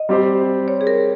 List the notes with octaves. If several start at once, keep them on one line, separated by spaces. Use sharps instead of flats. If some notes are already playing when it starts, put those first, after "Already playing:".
Already playing: D#5
G3 C4 G4 C5
C#5
G#4
A#4